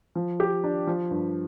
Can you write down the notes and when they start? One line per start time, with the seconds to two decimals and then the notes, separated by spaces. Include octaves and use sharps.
0.15 F3
0.40 G4
0.64 D4
0.87 F3
1.11 G2